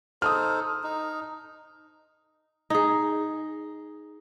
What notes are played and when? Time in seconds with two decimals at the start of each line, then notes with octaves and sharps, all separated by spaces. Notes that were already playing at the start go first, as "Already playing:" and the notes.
0.22 D#4 A4 C5 D#6 F6
0.83 D#4
2.70 D#4 G#4